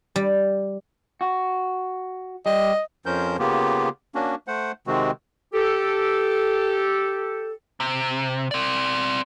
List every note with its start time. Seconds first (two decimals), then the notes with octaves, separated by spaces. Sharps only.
0.16 G3
1.21 F#4
2.46 G3 D#5
3.06 F2 F3 C#4 A#4 C5 G6
3.39 C#3 A#3 B3 F4 G4
4.15 A#3 C#4 D4 F#4
4.48 A3 C5 F#5
4.87 C3 D#3 G#3 C4 F#4
5.53 G4 A4
7.80 C3
8.51 C4 D5